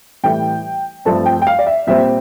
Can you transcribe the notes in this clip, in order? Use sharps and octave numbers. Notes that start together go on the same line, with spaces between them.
A2 E3 G3 G5
G2 F3 A3 C4 A5
G5
G5
F5
D5
E5
A#2 G3 C4 E5